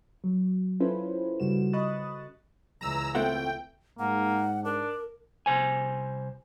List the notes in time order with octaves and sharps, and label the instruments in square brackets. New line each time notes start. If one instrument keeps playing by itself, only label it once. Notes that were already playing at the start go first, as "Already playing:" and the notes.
[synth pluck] F#3
C#4 E4 F4 A4 B4 C5
G2 C#3 G3 F#4 E7
D#5 B5 C#6 D#6 F#6 A6
[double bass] C#2 E3 [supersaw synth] A#5 E6
[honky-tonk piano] A3 [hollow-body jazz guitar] C4 F4 F#5 [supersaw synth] G5
[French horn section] G#2 [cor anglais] A#3 [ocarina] F#5
[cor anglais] D4 [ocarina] A#4
[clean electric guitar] C2 C5 G#5